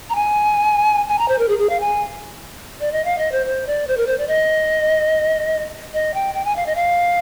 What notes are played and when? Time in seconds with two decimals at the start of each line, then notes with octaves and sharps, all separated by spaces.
0.10 A#5
0.15 G#5
1.08 G#5
1.19 A#5
1.28 C5
1.39 A#4
1.49 G#4
1.59 G#4
1.70 F5
1.80 G#5
2.80 D5
2.92 D#5
3.05 F5
3.18 D#5
3.32 C5
3.46 C5
3.67 D5
3.87 C5
3.97 A#4
4.07 C5
4.18 D5
4.28 D#5
5.94 D#5
6.14 G5
6.34 G5
6.45 G#5
6.56 F5
6.66 D#5
6.76 F5